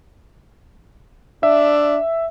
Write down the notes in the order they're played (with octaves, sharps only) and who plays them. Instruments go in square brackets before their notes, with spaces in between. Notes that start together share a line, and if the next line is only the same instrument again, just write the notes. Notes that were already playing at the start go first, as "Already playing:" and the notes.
[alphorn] D4 [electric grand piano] E5